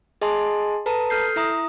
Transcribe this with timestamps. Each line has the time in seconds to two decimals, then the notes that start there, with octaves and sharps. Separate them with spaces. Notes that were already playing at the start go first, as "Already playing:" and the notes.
0.21 G#4 D#5 G#5 A5 C6
0.86 A4 B4 A5 A#5
1.10 A4 F6 G6 C7
1.36 E4 E5 A#5 D#6